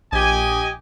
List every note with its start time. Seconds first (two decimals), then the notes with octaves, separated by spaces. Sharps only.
0.12 A#1 G4 D#5 G#5